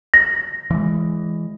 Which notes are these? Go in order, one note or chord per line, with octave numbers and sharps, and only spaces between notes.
A#6
E3 G#3